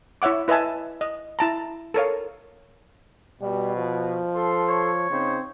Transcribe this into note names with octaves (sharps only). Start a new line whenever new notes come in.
E4 C#5 E5 F#5 D6
E4 B4 D#5 E5 G#5 A5
D#5
E4 A5 A#5
A4 A#4 C#5 F5
B2 G3
F3
A4 C6
C#5
C#3 C4 D#4 C5